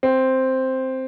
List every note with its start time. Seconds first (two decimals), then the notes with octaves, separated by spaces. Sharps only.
0.03 C4